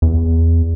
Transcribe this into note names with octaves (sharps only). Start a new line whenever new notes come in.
E2